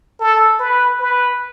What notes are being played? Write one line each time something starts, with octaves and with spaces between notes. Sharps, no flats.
A4
B4
B4